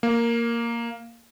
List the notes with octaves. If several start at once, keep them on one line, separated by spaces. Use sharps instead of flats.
A#3